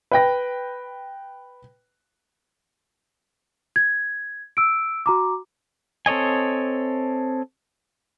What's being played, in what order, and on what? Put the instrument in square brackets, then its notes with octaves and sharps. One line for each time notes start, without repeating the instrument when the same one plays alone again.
[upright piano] B4 G5 A#6
[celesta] G#6
E6 D7
F#4 A#5 D6
[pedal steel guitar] C4 A4 C#5 D#5 G#5